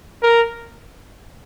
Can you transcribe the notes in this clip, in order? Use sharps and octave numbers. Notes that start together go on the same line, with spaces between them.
A#4